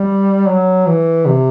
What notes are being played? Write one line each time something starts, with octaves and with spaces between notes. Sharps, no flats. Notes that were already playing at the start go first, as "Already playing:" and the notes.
Already playing: G3
F#3
E3
C3